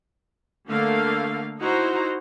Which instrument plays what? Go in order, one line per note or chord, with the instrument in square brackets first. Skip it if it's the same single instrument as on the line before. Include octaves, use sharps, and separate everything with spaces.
[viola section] D3 A3 A#3 F5
D#4 E4 F#4 C5 A#5